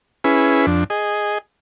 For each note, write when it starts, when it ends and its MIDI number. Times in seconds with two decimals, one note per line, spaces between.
0.24 0.66 61
0.24 0.66 64
0.24 0.66 68
0.24 0.66 71
0.67 0.84 41
0.67 0.84 62
0.90 1.38 68
0.90 1.38 75